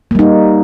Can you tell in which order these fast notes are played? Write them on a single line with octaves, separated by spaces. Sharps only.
A#3 G3 D#4